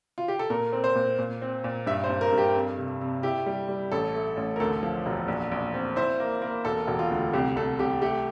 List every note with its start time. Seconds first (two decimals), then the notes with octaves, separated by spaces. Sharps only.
0.18 F4
0.28 G4
0.39 A4
0.50 A#2 A#4
0.72 C4
0.84 C5
0.95 A#2
1.19 A#2
1.42 C4
1.64 A#2
1.86 G2 E5
2.04 C5
2.09 G2
2.21 A#4
2.32 G2
2.38 G4
2.55 F2
2.78 C3
3.01 C3
3.23 E4 G4
3.46 G3
3.68 G3
3.92 A1 A4
4.15 A3
4.37 A1
4.56 A#4
4.60 D2 A4
4.83 F3
5.06 E1
5.28 A#1
5.51 A#1
5.74 C4
5.96 E4 C5
6.20 A#3
6.42 A#3
6.65 E1 A4
6.87 E1
6.99 F4
7.11 D2
7.33 C2 G4
7.56 C2 A4
7.79 C2 G4
8.02 A3 G4